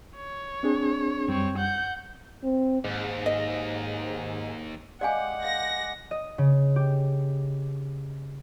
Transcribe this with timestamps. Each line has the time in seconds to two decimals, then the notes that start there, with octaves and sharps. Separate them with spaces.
0.15 C#5
0.63 C4 D4 G#4
1.28 F#2 G3 C4 C#5
1.58 F#5 G6
2.44 C4
2.84 D#2 G#2
3.26 D#5
5.01 G#3 G4 D5 F5 F#5 G#5 D6
5.45 F5 A#6
6.11 D#5
6.38 C#3
6.76 G4